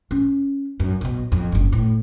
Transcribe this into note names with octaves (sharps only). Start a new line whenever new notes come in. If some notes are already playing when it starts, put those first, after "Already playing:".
C#4
F#2
B1 B2
F2
F#1 G2
A2